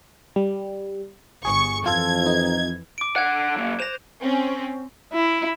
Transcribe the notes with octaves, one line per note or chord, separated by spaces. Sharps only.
G3
G1 G#4 C#6
F2 E3 F4 A4 G#6
D#4
D6 D7
D3 F#5 F#6 G#6
F#3 A#3
C5 A#6 F7
C4 C#4
E4